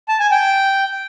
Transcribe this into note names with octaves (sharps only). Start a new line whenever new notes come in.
A5
G#5
G5